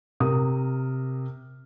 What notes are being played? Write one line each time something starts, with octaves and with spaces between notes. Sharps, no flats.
C3 A#4 D#6